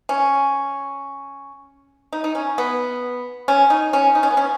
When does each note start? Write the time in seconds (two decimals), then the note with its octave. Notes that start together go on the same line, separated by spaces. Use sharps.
0.09 C#4
2.13 D#4
2.24 D#4
2.35 C#4
2.58 B3
3.48 C#4
3.70 D#4
3.93 C#4
4.15 D#4
4.23 C#4
4.30 B3
4.37 C#4